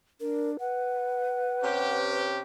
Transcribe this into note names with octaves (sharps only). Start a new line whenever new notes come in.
D4 A#4
B4 F#5
C3 C#4 G4